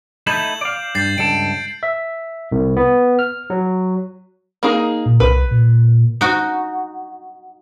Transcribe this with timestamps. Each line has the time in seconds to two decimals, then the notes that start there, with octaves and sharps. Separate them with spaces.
0.27 A3 D#4 E4 G6 E7 F#7
0.61 D5 F5
0.95 G2 G6 A6 C7
1.18 C#2 G2 A4 D7
1.83 E5
2.52 C2
2.77 B3
3.19 F6
3.50 F#3
4.63 A#3 D#4 G#4
5.06 A#2
5.20 C2 B4
5.51 A#2
6.21 D#4 F#4